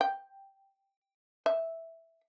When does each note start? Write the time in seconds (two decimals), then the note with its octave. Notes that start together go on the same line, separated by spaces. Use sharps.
0.01 G5
1.46 E5